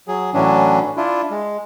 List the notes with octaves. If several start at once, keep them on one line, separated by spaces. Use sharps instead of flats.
F#3 G#4
A2 E3 F#3 C#4 D4
D4 E4 F4
G#3